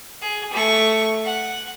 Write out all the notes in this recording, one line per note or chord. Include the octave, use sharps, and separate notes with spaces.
G#4
A3 C#6
F#5